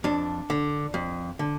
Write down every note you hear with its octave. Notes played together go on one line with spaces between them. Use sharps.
F2 D4
D3
F2
D3